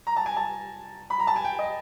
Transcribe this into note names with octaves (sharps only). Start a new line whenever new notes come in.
A#5
A5
G#5
A5
B5
A#5
A5
G#5
G5
D#5